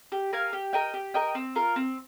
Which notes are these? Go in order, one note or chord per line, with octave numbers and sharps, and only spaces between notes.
G4
A#4 F5 G#5
G4
A#4 D#5 G5
G4
A#4 D#5 G5
C4
F4 A#4
C4